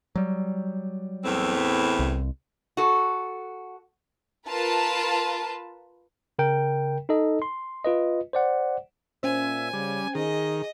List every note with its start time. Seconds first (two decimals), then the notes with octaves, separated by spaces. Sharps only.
0.16 F#3 G3
1.24 E2 A2 C4
1.99 C2
2.77 F#4 A4
4.47 F4 A#4 B4 A5
6.39 C#3 A#4 G5
7.09 D#4 A4 D#5
7.42 C6
7.85 F4 B4 D#5
8.33 C5 D5 F#5
9.23 A#2 C#4 C5 E5 G#5
9.73 C#3 G3
10.15 D#3 G#4 D#5